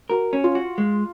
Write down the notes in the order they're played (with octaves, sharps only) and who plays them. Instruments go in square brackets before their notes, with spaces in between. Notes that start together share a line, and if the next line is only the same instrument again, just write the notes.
[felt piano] F#4 [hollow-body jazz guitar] A#4
[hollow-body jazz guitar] C#4
[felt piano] F4
[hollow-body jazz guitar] F#4
G#3